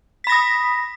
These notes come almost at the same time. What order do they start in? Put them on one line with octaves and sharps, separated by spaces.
B6 B5 A#6 D#6